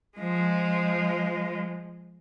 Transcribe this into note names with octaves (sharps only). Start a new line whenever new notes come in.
F3 G#3